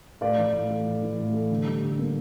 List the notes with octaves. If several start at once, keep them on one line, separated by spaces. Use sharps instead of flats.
A2 D5 F5
E3
A2
A3
A2
E3
A2
A3
D3
G3
D3
A#3